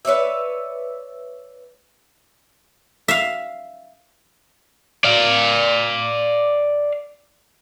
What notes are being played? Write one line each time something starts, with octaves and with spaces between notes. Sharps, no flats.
B4 C#5 D5 E5
E5 F5
D5 F5